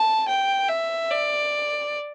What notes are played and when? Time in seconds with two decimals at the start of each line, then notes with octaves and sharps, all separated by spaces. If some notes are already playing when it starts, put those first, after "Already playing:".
Already playing: A5
0.28 G5
0.69 E5
1.11 D5